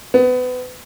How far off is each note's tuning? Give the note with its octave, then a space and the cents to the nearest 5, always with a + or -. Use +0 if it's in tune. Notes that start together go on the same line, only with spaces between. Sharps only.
B3 +25